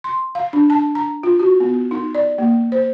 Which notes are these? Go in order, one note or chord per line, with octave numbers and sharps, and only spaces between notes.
C6
F5
D4
A5
A#5
F4
F#4
B3
D#4
D5
A#3
C5